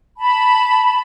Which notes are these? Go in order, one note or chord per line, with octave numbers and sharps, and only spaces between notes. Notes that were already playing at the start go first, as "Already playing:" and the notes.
A5 B5